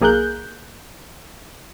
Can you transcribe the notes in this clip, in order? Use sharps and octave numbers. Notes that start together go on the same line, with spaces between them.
B1 A#3 G#4 A#4 F#6 G6